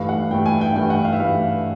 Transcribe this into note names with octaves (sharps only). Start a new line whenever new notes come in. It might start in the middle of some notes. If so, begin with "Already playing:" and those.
Already playing: G2 E3 A3 F5
F#5
G2 E3 A3 G5
G#5
G5
G2 E3 A3 G5
F#5
F5
E5
G2 E3 A3 F5